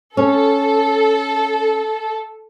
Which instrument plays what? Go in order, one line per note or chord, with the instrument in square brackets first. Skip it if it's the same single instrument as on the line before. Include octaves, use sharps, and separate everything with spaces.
[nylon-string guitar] C#4 [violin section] A4